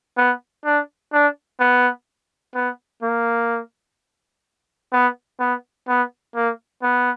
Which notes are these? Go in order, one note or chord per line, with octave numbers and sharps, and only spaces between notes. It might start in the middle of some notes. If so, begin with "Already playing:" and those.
B3
D4
D4
B3
B3
A#3
B3
B3
B3
A#3
B3